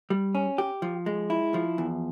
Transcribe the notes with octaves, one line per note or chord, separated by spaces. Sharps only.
G3
C#4
G4
F3
G#3
E4
F3
E2